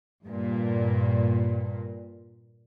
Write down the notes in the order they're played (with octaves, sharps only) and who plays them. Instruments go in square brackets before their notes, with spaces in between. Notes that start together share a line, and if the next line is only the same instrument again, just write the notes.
[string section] G2 A#2